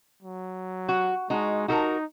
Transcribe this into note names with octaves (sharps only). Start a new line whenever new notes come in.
F#3
F#4
G#3 D#4 F#4
D#4 F#4 A4 A#4